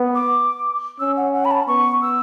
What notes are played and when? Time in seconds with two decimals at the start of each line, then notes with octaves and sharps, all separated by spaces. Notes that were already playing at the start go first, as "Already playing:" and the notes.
Already playing: B3
0.15 D6
0.99 C#4 E6
1.17 F#5
1.34 F#5
1.45 B5
1.51 A5
1.67 B3 C#6
2.02 E6